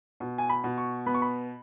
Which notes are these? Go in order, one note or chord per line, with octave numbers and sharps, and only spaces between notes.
B2
G#5
B5
B2
C#6
B3 B5
C#6
B5